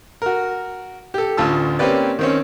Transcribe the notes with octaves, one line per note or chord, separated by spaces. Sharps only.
F#4 A#4
G4 A4
A1 D2 F4 A5 E6
A#3 C4 C#4 G4 B4 D5
D#3 C4 C#4